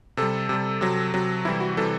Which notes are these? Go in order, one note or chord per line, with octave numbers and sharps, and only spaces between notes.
C3 G3 A4
C3 G3
C3 F#3
C3 F#3
C3 E3 G3 E4
F#4
C3 E3 G3 A4